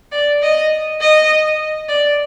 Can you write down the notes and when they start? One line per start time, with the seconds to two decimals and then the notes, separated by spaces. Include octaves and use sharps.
0.12 D5
0.42 D#5
1.01 D#5
1.89 D5